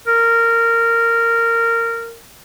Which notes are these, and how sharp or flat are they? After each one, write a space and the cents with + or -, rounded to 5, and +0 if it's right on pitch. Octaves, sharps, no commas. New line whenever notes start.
A#4 -15